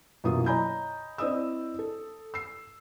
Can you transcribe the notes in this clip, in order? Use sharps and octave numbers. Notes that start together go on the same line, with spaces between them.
F#2 B2 E3 A#3 F4 D#6
C#5 D#5 G#5 A#5 B5 G6
C4 E4 D5 D#5 D#6 E6
A4
E6 C7